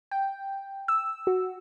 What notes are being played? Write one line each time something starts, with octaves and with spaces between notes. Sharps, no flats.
G5
E6
F#4